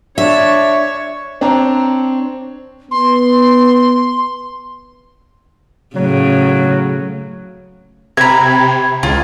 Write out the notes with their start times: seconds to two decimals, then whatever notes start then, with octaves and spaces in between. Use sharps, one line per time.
0.18 D4 C#5 E5
1.41 C4 D4 C#5 A#5
2.91 B3 C6
5.96 A2 C#3 F#3
8.17 C3 A#5 B5 G#6
9.03 C#2 F4